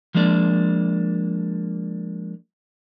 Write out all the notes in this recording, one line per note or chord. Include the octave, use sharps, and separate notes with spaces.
F3 G#3 A#3 D4 D5